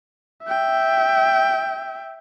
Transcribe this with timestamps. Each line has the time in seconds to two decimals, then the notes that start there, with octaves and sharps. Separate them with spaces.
0.44 E5 G5